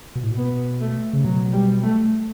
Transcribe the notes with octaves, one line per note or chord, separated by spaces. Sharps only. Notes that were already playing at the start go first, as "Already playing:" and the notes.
B2
A2
B2
B3
A3
C#3
B2 F#3
G3
A3